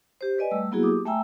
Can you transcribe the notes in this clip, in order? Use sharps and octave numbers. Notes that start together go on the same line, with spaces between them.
G4 C5
B4 D5 D#5 G#5
G3 A3 E6
F#3 A#3 B3 E4 F#4 G#4
G4 D6 D#6
A3 E5 G5 G#5 A#5 E6